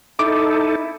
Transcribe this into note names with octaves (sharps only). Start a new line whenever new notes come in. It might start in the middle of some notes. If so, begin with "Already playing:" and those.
D#4 E4 A4 D6